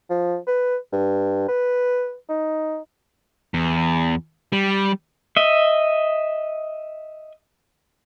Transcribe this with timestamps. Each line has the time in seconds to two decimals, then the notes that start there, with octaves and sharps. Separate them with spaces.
0.10 F3
0.47 B4
0.92 G2
1.48 B4
2.29 D#4
3.54 E2
4.53 G3
5.37 D#5 E5